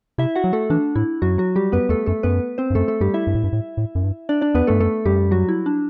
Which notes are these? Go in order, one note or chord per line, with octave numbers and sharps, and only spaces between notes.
C3 E4 E5
F#4 F#5
F#3
A3 A4
E3 D4
A2 E4
F#2 F#3 F#4
F#3 F#4
G3 G4
F#2 B3 B4
E2 A3 A4
F#2 A3 A4
F#2 B3 B4
C4 C5
G2
F#2 A3 A4
A3 A4
G2 G3 G4
E4 E5
G2
A2
G2
A2
A2
F#2
G2
D4 D5
D4 D5
E2 B3 B4
G2 A3 A4
F#2 A3 A4
F#2 G3 G4
F#3 F#4
E4
D4